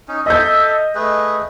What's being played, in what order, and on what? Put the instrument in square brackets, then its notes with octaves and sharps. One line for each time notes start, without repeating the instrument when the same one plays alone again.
[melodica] C#4 D#4
[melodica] A4 E5 [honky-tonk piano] D#5 G6
[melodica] A3 G#4 B4